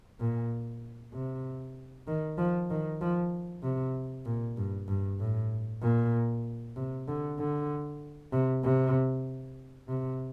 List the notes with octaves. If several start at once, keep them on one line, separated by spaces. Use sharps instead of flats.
A#2
C3
D#3
F3
D#3
F3
C3
A#2
G2
G2
A2
A#2
C3
D3
D3
C3
C3
C3